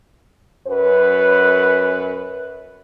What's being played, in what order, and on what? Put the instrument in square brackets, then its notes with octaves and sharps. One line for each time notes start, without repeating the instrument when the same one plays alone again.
[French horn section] F#2 B4